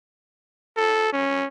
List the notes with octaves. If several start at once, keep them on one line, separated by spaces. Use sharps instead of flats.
A4
C#4